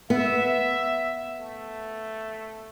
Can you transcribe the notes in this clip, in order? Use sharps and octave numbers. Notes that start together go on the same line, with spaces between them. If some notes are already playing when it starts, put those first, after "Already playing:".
B3 E5
A3